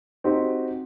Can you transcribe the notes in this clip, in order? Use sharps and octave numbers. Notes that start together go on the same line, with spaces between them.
C4 D#4 F#4 G4